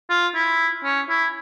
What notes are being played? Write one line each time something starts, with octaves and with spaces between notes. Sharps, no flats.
F4
E4
C#4
E4